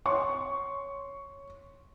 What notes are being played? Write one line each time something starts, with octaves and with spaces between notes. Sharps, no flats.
C#5 C6 C#6